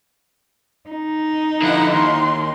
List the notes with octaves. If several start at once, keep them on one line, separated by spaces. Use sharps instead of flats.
D#4
D3 F3 E4 F#5
D#2 C6